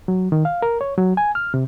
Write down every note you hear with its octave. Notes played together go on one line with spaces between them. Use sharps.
F#3
D#3
F5
A#4
C#5
F#3
G#5
F6
C3